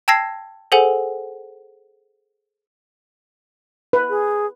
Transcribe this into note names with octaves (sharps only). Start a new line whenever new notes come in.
G5 A5 E6 G#6 A#6 C7
G#4 A4 C5 F#5 G#5
B4
G#4